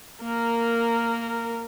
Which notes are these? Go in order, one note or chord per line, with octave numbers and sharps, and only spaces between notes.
A#3 A#4